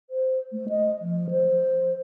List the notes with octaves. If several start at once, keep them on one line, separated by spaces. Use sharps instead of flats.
C5
A3
D#5
F3
C5